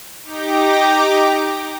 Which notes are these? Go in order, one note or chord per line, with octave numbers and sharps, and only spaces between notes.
D#4 G4 G5 A#5 D6